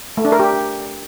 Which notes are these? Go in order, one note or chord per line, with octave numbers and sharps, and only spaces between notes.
A3
D4
A#4
G4